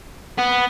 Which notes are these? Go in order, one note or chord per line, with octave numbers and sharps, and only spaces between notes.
B3